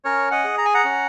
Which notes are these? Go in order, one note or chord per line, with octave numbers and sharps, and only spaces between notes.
C#4 A#4 C#5
D#5 F#5
G#4
A#5
G#5
F#5 A#5
C#4